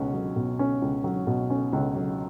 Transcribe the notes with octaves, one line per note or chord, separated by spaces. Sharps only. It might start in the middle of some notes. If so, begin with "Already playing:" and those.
Already playing: C#2 B2 C#4
F#3
B2
C#4
C#2
F#3
B2
C#4
C#2
F#3